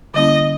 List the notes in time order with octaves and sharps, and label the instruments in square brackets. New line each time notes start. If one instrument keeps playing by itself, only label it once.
[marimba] D3 G3 A#3 C#4 E4 [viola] D#5